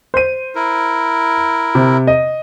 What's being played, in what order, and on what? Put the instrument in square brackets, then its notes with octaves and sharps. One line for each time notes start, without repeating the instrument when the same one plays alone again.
[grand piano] C5 D#7
[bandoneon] E4 A#4
[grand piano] C3
D#5